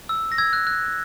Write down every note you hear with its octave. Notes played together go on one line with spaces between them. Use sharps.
E6
A#6
E6 G#6
F#6
F#6